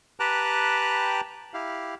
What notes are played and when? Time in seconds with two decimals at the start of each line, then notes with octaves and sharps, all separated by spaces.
0.20 G4 B4 G5 A5 A#5 F#6
1.54 E4 G4 F5